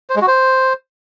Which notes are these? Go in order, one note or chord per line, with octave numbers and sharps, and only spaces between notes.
C5
G#3
F#4
C5